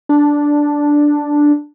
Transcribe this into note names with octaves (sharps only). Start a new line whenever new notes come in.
D4